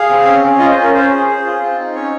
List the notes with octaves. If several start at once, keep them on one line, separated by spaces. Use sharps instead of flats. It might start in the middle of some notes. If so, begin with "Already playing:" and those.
Already playing: G#4 F5
C4
C#4
C#4
F4 D#5
C5
C#4
A#4
C#4 C5
G#4
G#4
F4
C4
D#4
C#4 C#5